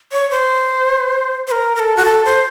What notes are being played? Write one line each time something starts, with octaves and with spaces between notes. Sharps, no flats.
C#5
C5
C5
A#4
A#4
A4
F#4
A4
C5